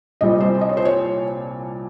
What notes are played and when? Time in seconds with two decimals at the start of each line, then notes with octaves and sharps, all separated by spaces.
0.21 C2 A#2 G3 C4 D#5
0.40 C5
0.61 D#5
0.69 C#5
0.77 C5
0.85 C#5